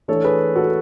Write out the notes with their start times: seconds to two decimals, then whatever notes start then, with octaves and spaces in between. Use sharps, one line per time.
0.08 E3 A3 D4 A4 C#5
0.24 G#4 B4
0.56 F#4 A4